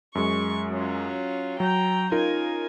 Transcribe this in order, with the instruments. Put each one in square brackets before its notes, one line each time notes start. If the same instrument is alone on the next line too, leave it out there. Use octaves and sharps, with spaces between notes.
[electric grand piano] F#2 G#3 [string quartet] C#6
[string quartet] F#3 C#4 F4
[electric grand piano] F#3 [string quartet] G5 A#5 G6
[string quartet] C#3 G#5 [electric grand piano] D#4 F4 A#4